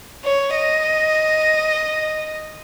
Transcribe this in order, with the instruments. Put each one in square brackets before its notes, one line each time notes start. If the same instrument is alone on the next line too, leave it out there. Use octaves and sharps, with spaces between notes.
[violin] C#5
D#5